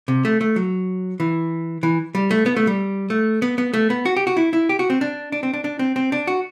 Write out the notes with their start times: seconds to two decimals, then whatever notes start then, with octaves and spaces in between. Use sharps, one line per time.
0.08 C3
0.25 A3
0.41 A3
0.56 F#3
1.20 E3
1.83 E3
2.15 G3
2.31 A3
2.46 B3
2.56 A3
2.67 G3
3.10 A3
3.42 B3
3.58 B3
3.74 A3
3.90 B3
4.06 F#4
4.16 G4
4.27 F#4
4.37 E4
4.53 E4
4.69 G4
4.79 F#4
4.90 C4
5.01 D4
5.32 D4
5.43 C4
5.53 D4
5.64 D4
5.79 C4
5.96 C4
6.12 D4
6.27 F#4